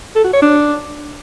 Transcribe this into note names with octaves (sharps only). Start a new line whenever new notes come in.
A4
F#4
C#5
D4